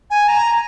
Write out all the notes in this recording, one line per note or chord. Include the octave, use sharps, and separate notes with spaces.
G#5
A#5